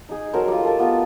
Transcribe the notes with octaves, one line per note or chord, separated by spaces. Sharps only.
D#4 G#4
F#3 A4 A#4 C5
G3 F4
A4 A#4
A3 B3 F4